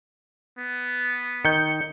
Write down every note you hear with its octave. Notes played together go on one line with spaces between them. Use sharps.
B3
D#3 G6 C#7